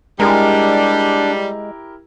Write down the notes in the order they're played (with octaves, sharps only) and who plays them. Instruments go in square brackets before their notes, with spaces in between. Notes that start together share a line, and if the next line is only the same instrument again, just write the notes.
[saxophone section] G3 [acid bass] G#3 [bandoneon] D4 [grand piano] E4 G4 A#4